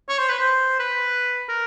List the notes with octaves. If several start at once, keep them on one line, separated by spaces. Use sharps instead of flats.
C#5
C5
B4
C5
B4
A#4